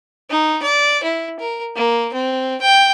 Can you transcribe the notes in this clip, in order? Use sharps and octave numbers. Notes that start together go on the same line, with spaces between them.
D#4
D5
E4
A#4
A#3
C4
G5